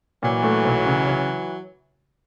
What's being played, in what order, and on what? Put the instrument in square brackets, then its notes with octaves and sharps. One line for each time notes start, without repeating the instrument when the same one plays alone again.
[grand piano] A#2 [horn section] E3 F#3
[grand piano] A3
B1
C#3
C#3